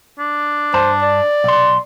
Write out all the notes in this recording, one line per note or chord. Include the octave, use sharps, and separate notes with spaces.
D4
G2 C5 A5
D5
B1 C6